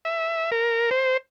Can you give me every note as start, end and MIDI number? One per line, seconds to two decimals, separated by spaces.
0.05 0.51 76
0.51 0.90 70
0.91 1.17 72